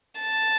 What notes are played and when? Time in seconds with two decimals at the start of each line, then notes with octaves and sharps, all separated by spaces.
0.21 A5